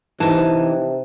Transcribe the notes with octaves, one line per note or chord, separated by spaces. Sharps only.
C3 E3 D#4 A5